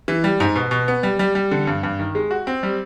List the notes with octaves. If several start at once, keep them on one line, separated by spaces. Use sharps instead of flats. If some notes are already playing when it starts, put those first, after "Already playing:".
E3
G3
G#2
B2
B2
B3
G3
G3
G3
D3
G2
G2
D#3
G#3
F#4
C4
G3